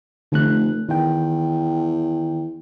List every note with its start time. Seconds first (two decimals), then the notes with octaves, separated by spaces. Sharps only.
0.32 F1 D3 A3 F#6
0.89 E2 D#3 G5